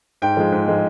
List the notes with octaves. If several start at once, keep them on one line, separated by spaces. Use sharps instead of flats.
G#2 G5
F3 G#3
G#2
F3 G#3